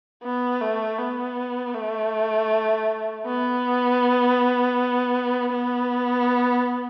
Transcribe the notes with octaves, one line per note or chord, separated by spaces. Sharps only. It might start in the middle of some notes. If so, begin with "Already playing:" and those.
B3
A3
B3
A3
B3
B3